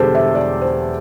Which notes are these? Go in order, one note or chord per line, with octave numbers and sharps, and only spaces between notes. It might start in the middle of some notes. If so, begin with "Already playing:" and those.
Already playing: E1 E2 D3 G3 G4 A4 C5
E5
D5
C5